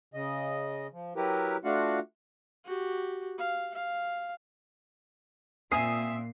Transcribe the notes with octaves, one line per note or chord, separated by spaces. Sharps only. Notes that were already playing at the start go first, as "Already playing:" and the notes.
C#3 D#5
F3
F#3 E4 G4 A#4 B4
A3 D4 F4 F#4 F5 F#5
F#4 G4
F5
F5
A#2 C4 E5 G#5 D#6 C7